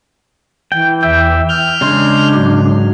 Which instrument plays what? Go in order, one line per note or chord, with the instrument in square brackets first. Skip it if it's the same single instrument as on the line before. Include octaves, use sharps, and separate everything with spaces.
[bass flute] E3 [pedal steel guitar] G5
[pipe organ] E2 E5 [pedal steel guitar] G5
[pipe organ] F6 G6
[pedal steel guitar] C#3 G#3 C6 [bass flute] D4
[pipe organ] G#2 F#3